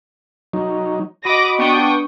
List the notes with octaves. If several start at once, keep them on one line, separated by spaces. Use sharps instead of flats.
F#3 D#4
F#4 D#5 B5 D6 D#6 A#6
B3 D4 G5 C#6 D#6